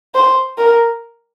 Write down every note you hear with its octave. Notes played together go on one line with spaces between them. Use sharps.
C5
A#4